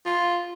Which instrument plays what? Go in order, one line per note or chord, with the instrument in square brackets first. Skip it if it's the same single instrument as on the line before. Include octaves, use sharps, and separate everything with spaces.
[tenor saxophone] F4